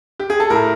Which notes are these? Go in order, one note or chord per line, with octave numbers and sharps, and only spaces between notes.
G4
G#4
A4
A2 A#4